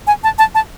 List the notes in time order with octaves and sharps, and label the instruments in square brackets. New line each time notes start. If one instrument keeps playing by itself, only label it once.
[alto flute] G#5
A5
A5
A5